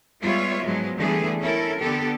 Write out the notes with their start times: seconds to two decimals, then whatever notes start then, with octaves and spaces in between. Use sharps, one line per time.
0.20 G3 G#3 B3 F4 C#5 E5
0.65 G#2 F3 F#3 G#3 B3
0.97 D3 E3 G3 A3 B3 G#4
1.40 C#4 E4 A4 A#4
1.80 D3 B3 G4 A4